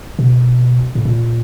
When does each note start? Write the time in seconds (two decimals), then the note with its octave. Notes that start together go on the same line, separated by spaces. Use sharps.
0.19 B2
0.95 A2
1.05 A#2